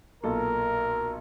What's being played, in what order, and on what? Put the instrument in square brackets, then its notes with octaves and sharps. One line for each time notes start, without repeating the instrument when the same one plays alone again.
[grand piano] B1 A#2 A4 [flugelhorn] A#4